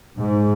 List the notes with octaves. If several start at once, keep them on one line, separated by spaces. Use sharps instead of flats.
G#2